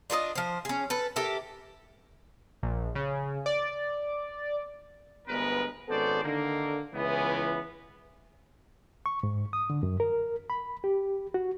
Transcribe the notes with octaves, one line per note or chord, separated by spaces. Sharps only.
D4 F4 A4 D#5
F3 C5
C#4 G#4
A4 B4
G4 A4 A#4 E5
A#1
C#3
D5
G1 D2 G#3 B3 A#4 B4
G#1 B3 C#4 A4 C5 D5
D3 D#3 A#3
C#2 E3 B3
C#6
G#2
D#6
D3
F#2
A#4
B5
G4
F#4